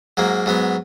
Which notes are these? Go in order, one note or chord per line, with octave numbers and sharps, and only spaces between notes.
G#2 F#3 A#3
G#2 F#3 B3